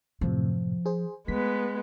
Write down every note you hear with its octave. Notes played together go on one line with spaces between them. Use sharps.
F#2 A2 C3 F3
G#4 C5
G#3 A3 B3 B6